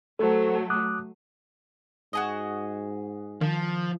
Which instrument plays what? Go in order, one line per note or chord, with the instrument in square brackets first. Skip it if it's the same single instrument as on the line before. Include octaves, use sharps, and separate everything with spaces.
[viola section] F#3 A3 [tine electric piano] A4 C5
[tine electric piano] D6 D#6 F#6
[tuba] G#2 [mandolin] F#4 G#4 D#5
[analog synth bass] D#3 [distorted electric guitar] F3